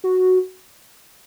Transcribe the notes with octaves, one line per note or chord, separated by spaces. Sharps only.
F#4